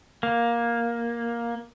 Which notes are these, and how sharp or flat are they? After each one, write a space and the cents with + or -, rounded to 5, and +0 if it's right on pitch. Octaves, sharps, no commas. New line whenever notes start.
A#3 +10